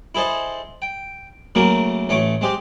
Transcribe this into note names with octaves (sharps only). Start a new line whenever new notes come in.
E4 G#4 A4 C5 D#5
G5
C#3 F#3 A3 A#3 A#4
A1 A3 C#5 C#6 D6
G#3 C4 G4